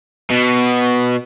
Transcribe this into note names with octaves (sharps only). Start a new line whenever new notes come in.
B2